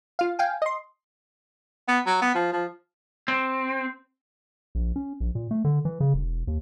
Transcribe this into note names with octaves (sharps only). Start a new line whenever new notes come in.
F4 F5
F5 G5 G#5
D#5 C6
B3
F#3
B3
F3
F3
C4
A#1
C#4
A#1
A#2
A3
D3
E3
C#3
E1
D#2